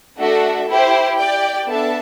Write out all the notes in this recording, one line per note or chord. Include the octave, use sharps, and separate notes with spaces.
A3 D4 F#4 A4 E5
E4 G4 C5
G4 D5 G5
B3 D4 A4 E5 A5